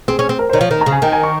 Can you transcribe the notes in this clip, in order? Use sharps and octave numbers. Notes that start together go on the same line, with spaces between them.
C4 G#4
C#4
C4
A#4
C5
D#3 C#5
F3
D#3
A#5
C#3
G#5
D#3 G5
G#5
C#6